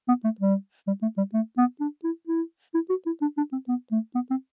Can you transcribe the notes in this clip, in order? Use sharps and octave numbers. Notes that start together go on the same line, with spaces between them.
B3
A3
G3
G3
A3
G3
A3
B3
D4
E4
E4
E4
F#4
E4
D4
D4
C4
B3
A3
B3
C4